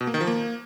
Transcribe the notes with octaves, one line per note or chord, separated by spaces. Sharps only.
B2
A#3
D#3
F3
A#3